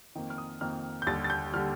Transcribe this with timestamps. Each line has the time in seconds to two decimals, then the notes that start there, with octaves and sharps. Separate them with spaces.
0.15 F2 D#3 A#3
0.30 F6
0.38 D#6
0.61 F2 D#3 A#3 F6
1.02 G6
1.07 D#2 D3 G3 A6
1.24 A6
1.30 G6
1.53 D3 G3 F6